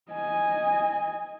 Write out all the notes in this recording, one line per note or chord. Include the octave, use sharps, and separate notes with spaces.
D#5 G#5